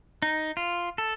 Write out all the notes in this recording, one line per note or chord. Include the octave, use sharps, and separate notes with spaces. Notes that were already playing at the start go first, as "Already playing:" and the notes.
D#4
F4
A4